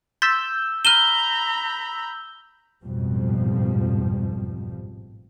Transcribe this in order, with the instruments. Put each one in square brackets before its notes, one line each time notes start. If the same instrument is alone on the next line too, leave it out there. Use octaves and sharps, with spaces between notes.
[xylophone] C6 A6 B6 [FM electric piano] E6 G6
[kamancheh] A#5 B5 [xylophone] F6 D#7 E7 [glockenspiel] G7
[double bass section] A1 F2 G#2 B2 F3 G3